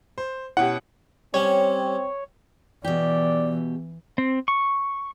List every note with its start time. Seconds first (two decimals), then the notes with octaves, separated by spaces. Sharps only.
0.18 C5
0.57 B2 C#4 E4 G4 F#5
1.34 G3 C4 C#4 C#5
2.85 B2 E3 G4 D5
4.18 C4
4.48 C#6